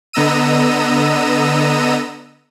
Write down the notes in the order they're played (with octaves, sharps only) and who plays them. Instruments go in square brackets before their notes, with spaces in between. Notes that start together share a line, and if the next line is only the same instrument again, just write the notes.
[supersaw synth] D3 B3 D#5 A#5 E6 D#7